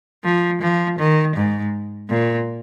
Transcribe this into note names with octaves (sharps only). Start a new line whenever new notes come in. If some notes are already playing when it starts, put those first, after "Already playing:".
F3
F3
D#3
G#2
A#2